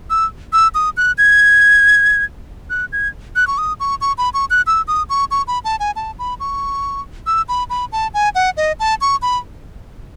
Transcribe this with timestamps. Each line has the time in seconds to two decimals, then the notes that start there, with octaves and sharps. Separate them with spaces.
0.10 E6
0.53 E6
0.75 D#6
0.97 F#6
1.18 G#6
2.70 F#6
2.93 G#6
3.36 F#6
3.47 C#6
3.58 D#6
3.80 C#6
4.01 C#6
4.18 B5
4.34 C#6
4.50 F#6
4.67 E6
4.88 D#6
5.10 C#6
5.31 C#6
5.48 B5
5.65 A5
5.80 G#5
5.96 A5
6.19 B5
6.40 C#6
7.27 E6
7.49 B5
7.70 B5
7.92 A5
8.14 G#5
8.35 F#5
8.57 D#5
8.80 A5
9.01 C#6
9.22 B5